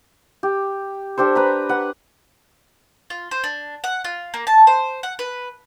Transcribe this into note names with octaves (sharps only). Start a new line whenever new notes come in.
G4
D4 G4 A4 C5
B4 A#5 B5
B4 F#5
F4
C5
D4
F#5
F4
A#3
A5
C5
F#5
B4